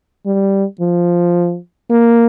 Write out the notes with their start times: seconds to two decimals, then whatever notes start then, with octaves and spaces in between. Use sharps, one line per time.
0.26 G3
0.81 F3
1.90 A#3